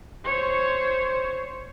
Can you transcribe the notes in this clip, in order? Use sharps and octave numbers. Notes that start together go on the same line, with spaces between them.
C5 C#5